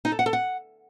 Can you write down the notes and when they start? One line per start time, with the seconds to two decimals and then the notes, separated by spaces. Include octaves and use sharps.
0.05 D#4
0.12 A4
0.19 F#5
0.26 A4
0.33 F#5